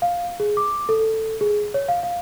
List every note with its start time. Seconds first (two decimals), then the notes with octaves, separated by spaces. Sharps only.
0.02 F5
0.40 G#4
0.57 D6
0.89 A4
1.41 G#4
1.74 C#5
1.89 F5
2.03 F5